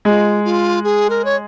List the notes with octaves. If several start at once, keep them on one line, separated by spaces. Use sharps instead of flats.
G#3 F4 G#4
F4
G#4
A#4
C#5